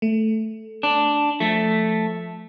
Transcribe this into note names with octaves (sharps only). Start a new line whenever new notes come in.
A3
D4
F3 A3 B6